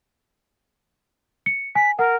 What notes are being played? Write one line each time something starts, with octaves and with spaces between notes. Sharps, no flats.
C#7
G#5 B6
A#4 F#5